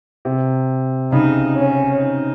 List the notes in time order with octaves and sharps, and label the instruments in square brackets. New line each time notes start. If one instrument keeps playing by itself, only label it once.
[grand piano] C3
[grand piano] C#3 [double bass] D#4
[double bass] C#4
D#4